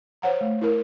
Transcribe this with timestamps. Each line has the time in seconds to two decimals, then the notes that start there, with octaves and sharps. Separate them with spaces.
0.22 C5 C#5 F#5 A#5
0.41 A3
0.61 E4 A#4